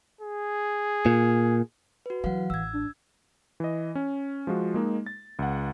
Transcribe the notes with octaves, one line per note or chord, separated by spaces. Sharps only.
G#4
A#2
F#4 B4
E3 F#3 F5 F#5
A1 E6 G#6
D4
E3 D#5
C#4
F3 G#3 F4 F#4
G#3 A#3 D#4
A6
C#2 F#5